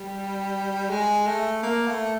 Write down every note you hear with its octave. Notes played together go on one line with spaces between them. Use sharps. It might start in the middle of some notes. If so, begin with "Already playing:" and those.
Already playing: G3
G#3
A3
A#3
A3